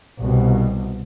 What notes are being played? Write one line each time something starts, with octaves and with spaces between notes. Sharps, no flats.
C2 B2